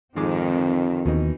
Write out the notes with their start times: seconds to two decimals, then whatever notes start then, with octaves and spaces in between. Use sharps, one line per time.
0.16 F2 G#2 D#3 C4 G#4 D6
1.06 D#2 B2 E3 D#4